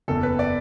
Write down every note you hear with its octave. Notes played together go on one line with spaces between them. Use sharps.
F#1 E2 E3 A4
B4
D5